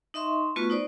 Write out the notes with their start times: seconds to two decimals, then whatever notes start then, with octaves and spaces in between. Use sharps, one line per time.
0.14 D#4 D#5 E5 C6 C#6
0.56 A3 B3 F4 F#4 B4 C#6
0.70 D#4 C5 D5